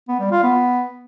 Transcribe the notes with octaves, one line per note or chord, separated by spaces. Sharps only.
B3
G3
F4
B3